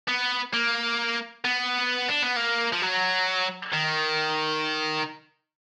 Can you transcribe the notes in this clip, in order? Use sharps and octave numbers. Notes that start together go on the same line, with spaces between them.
B3
A#3
B3
D4
B3
A#3
F3
F#3
D#3